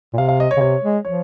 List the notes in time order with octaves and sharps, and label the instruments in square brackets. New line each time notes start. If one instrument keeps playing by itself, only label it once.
[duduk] A#2
[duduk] C3 [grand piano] F5
[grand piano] F5
D#5
C#5
[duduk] C#3
[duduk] C3 [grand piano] C#5
[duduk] G#3
[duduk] F3 [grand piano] C#5